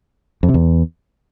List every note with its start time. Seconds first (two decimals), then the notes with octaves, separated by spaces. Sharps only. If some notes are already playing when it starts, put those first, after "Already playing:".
0.43 F2
0.49 C3
0.54 E2